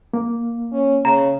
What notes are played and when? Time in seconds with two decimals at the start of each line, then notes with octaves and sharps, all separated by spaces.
0.14 A#3
0.72 C#4
1.05 C#3 A#5